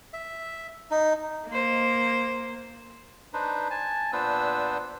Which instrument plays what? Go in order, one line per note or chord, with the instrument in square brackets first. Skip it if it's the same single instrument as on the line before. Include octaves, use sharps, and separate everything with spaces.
[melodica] E5
D#4
[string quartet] A#3 C5
[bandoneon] D4 D#4 B4 C5
G#5 A5
A#2 B3 D4 B4 C5 E6